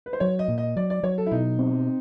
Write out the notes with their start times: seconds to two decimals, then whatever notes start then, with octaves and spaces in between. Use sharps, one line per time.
0.06 B4
0.13 C5
0.20 F#3 C#5
0.39 D#5
0.48 A#2
0.58 D#5
0.76 F#3 D5
0.90 D5
1.03 F#3 C#5
1.18 A4
1.26 E4
1.31 B2 D#4
1.59 C4